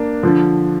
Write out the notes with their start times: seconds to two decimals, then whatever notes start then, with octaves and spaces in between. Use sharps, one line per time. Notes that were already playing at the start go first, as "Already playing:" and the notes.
Already playing: A#3 D4
0.23 D3 F3